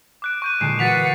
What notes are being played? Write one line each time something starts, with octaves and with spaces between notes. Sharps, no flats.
D6 F#6 D7
C#6 G6 D#7
A#2 D3 G#3 C7 E7
E3 F#4 B4 F#5 A6 B6 F7